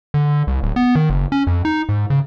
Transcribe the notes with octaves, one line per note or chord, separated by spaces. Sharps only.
D3
C2
D1
B3
D#3
F#1
C#4
F2
D#4
G#2
C#3